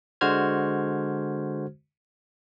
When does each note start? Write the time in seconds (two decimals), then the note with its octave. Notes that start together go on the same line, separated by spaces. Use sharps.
0.21 D3 G#3 F#4 C5 F6 G#6